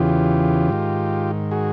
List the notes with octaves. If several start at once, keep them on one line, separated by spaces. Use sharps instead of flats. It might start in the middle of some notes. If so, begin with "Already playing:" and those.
Already playing: E2 C#3 E3 F4 G4
G#2 D#3
F#4 G#4